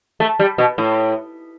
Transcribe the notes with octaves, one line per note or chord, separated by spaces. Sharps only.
A3
G3
B2
A2